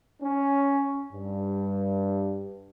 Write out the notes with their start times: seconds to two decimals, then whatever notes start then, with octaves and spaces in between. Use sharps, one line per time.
0.21 C#4
1.12 G2